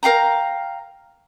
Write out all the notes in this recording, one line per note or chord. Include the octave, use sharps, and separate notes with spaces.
A#4 F5 G5 A#5